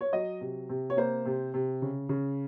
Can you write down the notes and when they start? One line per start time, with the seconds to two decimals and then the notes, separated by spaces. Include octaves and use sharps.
0.01 C#5
0.13 F#3 D#5
0.41 C3
0.69 C3
0.90 C#5
0.97 A#3 C5
1.26 C3
1.54 C3
1.82 C#3
2.09 C#3